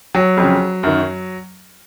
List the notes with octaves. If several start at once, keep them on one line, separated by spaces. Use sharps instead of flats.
F#3
F2
C#3
F#2 D#3